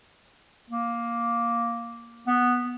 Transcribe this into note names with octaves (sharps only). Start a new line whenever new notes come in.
A#3
B3